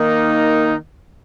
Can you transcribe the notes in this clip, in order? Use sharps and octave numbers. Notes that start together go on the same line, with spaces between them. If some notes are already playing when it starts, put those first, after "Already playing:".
Already playing: D#3 A#3 D#4